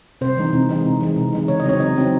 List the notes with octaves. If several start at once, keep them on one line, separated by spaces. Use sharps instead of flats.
C3 C5
E3 G#3 D#4
C3
E3 G#3 D#4
C3
E3 G#3 D#4
C3
E3 G#3 D#4
C#3 C#5
D#5
F#3 C4 D#4 C#5
C#3 D#5
F#3 C4 D#4